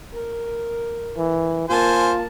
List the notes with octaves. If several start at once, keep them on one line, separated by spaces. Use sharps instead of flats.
A#4
E3
A#3 F4 C5 G#5 A5